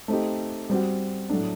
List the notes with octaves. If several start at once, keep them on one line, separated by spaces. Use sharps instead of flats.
A3 C4 D#4 G4
G3 C4 F#4
A2 F#3 A3 D4